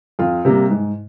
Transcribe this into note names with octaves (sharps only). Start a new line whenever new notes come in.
F2 F4
C3 G3 A#3
G#2